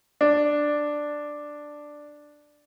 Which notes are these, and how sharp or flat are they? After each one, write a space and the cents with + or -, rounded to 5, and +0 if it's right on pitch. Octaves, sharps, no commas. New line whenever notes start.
D4 +5